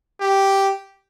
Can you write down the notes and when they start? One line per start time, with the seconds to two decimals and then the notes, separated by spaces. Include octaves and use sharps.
0.21 G4